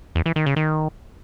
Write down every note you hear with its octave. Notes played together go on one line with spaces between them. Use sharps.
E2
E3
D#3
C#3
D#3